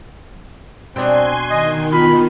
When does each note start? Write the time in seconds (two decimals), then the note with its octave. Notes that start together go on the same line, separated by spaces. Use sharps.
0.96 B2 C4 D4 G#5 C6
1.50 D#3 D#5
1.93 B3 F4 B5